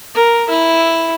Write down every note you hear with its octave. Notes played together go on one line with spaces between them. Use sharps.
A#4
E4